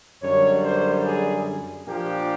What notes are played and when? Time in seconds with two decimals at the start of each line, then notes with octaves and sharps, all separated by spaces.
0.22 F#2 D3 G3 C#5
0.63 C5
1.04 G#4
1.86 A#2 F3 A#3 D4 G4